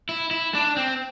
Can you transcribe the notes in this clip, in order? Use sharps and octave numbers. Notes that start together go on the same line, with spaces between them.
E4
E4
D4
C4